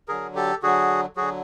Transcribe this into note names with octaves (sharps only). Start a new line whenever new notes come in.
D3 F#3 G#4 A#4
G4 A4
D3 F#3 F#4 G#4
D3 F#3 F#4 G#4